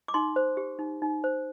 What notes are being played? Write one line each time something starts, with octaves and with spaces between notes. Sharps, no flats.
D6
D#4 C6
C5
G4
D#4
D#4
C5